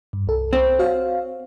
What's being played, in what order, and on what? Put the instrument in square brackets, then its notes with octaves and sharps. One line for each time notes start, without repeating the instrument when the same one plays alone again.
[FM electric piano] G2
C2 A4
[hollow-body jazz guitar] C4
[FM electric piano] F#4 C#5 F5